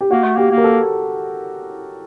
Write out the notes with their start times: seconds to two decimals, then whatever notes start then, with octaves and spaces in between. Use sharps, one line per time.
0.01 G4
0.10 A#3 F#4
0.23 A3
0.36 A#3 G4
0.51 A#3
0.58 A#4
0.64 A4